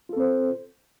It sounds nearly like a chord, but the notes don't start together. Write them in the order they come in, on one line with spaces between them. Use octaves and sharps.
F4 A4 C4 C5